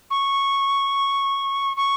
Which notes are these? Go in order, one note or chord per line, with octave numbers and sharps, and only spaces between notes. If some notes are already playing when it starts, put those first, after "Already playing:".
C#6
C#6